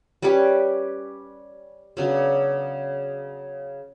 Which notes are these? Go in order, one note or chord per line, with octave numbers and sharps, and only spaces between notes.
G3 C#4 G4 B4
C#3 F#3 B3 D4